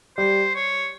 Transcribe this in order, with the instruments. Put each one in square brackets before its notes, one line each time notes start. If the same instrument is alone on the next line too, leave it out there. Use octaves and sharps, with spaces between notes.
[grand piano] G3 [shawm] C5
[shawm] C#5